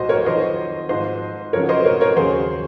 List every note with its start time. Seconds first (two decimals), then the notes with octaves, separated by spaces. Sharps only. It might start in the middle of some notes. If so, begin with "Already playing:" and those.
Already playing: C2 A#2 F#3 F#4 C5 D#5
0.09 A#4 C#5
0.26 F2 D#3 F#3 C5 D#5
0.89 G#2 F3 C5 D#5
1.53 F2 C#3 F#3 A#4 C#5
1.69 C5 D#5
1.85 A#4 C#5
2.01 A#4 C#5
2.17 D#2 C#3 F#3 G#4 C5